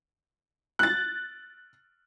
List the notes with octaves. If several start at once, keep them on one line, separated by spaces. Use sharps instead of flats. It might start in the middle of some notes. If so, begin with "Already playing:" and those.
F#6 A6